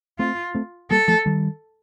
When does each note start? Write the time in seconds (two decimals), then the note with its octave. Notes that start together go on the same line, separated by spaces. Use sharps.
0.19 A3 C4 F4
0.55 A3 C4
0.91 G3 A#3 A4
1.08 F3 A3
1.26 D#3 G3